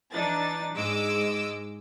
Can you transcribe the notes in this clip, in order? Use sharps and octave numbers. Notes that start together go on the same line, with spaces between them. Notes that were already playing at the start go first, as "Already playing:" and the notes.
E3 D4 D#4 A6
G#2 G#3 D#5 D6 E6